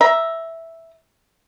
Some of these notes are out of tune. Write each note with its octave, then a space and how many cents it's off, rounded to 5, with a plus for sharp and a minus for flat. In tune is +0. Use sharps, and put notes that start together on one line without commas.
E5 +0 A#5 +15